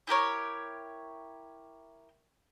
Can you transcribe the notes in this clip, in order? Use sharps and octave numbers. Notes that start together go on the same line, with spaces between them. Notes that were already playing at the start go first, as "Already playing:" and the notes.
E4 G4 A#4 C#5